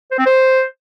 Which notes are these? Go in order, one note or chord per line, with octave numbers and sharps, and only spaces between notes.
C5
C4
C5